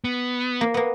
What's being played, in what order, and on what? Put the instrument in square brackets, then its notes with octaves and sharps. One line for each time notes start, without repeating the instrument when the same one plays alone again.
[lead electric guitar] B3
[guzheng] A#3
A#3 B3